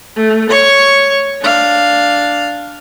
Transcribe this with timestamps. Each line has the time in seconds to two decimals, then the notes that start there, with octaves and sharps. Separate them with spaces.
0.16 A3
0.50 C#5 C#6
1.42 D4 F5